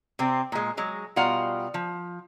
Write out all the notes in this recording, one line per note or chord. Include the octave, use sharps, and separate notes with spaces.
C3 C4
A#2 G#3
F#3 G#3
B2 G3 F4 F5 F#5 A#5
F3